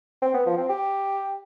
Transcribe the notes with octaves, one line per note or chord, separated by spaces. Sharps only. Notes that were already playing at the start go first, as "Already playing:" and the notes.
C4
B3
F3
C4
G4